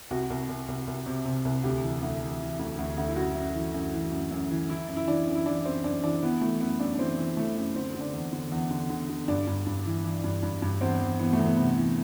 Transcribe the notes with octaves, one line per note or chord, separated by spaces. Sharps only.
C2 F#4
C2
C2
C2
C2
C3
C3
C2
D2 G4
E3
D2
E3
E3
D2
D2
D2
E4
F#2 F#4
F#2
E3
F#2
E3
F#2
F#2
E3
E3 E4
F#2
E4
E3 D4
F#2
E4
E3 D4
F#2 C4
F#2 D4
E3 D4
E3 B3
E3 A3
F#2 B3
F#2 D4
D4
E3 C4
E3
E3 A3
F#2
D3 C4
D3
D4
E2
D3
E2
D3
D3
D3
G2 D4
G2
G2
E3
E3
G2
G2
G2
E2 C4
E2
E3 B3
A3
E2
B3
C3
E3